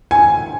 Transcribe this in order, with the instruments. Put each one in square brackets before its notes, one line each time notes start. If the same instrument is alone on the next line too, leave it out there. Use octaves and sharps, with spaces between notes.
[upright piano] G#5